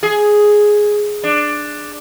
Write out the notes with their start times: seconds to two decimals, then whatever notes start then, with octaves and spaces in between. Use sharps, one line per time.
0.03 G#4
1.24 D4